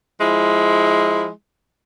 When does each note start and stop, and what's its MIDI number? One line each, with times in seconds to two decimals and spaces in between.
0.20 1.28 53
0.20 1.28 56
0.20 1.28 64